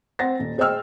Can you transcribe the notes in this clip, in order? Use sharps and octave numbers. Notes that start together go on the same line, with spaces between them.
C4 C5 F#5 A6 A#6
D#1
G#4 C5 D#5 G5 E6 F6